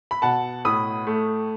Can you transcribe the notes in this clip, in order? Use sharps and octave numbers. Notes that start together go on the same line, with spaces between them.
B5
B2 F#5 A5
A2 B5 D#6
A3